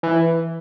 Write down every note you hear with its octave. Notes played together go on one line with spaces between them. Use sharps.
E3